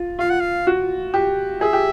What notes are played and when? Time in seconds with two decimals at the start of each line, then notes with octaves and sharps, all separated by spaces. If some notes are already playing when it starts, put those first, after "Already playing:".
Already playing: F4
0.19 F4 F5
0.30 F#5
0.41 F5
0.67 F#4
1.14 G4
1.61 G#4 E5
1.73 G4